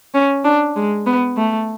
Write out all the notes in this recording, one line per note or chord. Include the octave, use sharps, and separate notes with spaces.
C#4
D4
G#3
B3
A3